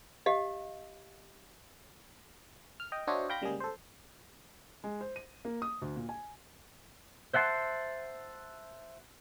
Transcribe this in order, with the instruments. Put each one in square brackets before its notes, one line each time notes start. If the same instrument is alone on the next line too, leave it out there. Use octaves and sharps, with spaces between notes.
[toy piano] G4 D#5 F5
[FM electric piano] F6
D#5 G5
D4 F#4 C5 C#5 D#5 E5
F5 G5 B5 G6 A#6
C#3 G3 G#3 A#3 G#4
A4 C5
[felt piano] G#3
C5
D#7
A#3
D#6
D2
A#2
G#5
[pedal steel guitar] C5 E5 F#5 A5 C6